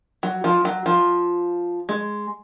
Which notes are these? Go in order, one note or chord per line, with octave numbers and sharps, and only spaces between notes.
F#3
F3
F#3
F3
G#3